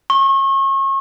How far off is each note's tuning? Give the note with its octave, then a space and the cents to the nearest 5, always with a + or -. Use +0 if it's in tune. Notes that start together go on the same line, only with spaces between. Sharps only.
C#6 -35